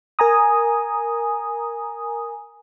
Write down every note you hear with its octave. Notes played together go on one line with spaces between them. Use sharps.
A#4 G#5 A#5 D#6